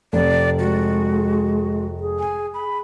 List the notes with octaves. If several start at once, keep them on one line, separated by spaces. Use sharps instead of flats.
F1 D5
G#3 F#4
G#4
G#5
B5